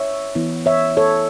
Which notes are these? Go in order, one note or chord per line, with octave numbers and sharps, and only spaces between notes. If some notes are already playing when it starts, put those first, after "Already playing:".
Already playing: C#5 E5
E3 B3 E4
C#5 E5
A4 C#5